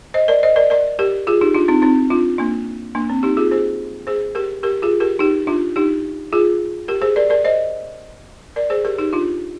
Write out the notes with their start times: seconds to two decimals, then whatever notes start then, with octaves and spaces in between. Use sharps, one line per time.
0.14 C5 D#5
0.28 A#4 D5
0.43 C5 D#5
0.56 A#4 D5
0.70 A#4 D5
0.99 G4 A#4
1.27 F4 G#4
1.41 D#4 G4
1.54 D4 F4
1.68 C4 D#4
1.82 C4 D#4
2.10 D4 F4
2.38 A#3 D4
2.95 A#3 D4
3.09 C4
3.23 D#4 G4
3.37 F4 G#4
3.51 G#4 C5
4.07 G#4 C5
4.35 G4 A#4
4.63 G4 A#4
4.82 F4 G#4
5.00 G4 A#4
5.19 D#4 G4
5.47 D4 F4
5.76 D#4 G4
6.33 F4 G#4
6.88 G4 A#4
7.02 G#4 C5
7.16 A#4 D5
7.30 A#4 D5
7.45 C5 D#5
8.56 A#4 D5
8.70 G#4 C5
8.85 G4 A#4
8.98 D#4 G4
9.13 D4 F4